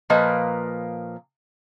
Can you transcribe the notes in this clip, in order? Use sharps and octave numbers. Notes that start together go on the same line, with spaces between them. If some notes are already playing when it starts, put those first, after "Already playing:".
A#2 F3 A#3 B4 D#5